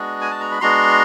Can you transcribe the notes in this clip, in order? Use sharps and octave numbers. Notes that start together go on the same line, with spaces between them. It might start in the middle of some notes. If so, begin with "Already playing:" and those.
Already playing: G#3 B3 D4 F#4
G#5
A5
A#5
B5
G#3 B3 D4 F#4 A#5 C6